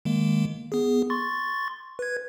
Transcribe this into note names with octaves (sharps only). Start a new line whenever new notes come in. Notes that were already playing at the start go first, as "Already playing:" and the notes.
D#3 G#3 A#3
B3 G#4
C6 C#6 A6
B4 G#6